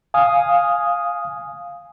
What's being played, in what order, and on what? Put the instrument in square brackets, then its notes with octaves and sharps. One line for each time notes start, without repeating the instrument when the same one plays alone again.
[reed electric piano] F5 G#5 D#6